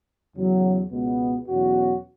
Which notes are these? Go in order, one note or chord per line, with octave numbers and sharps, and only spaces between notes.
E2 C#3 F#3
C#2 B2 G#3 B3
E2 B2 F#3 C#4 F#4